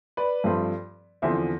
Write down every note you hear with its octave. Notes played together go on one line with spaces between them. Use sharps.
B4 D5
G2 F3 A3 C4
E2 D3 F3 C4 C5 E5